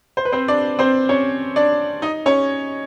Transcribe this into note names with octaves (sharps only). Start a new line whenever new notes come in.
C5
B4
C4 C5
D4 D5
C4 C5
C#4 C#5
D4 D5
D#4 D#5
C#4 C#5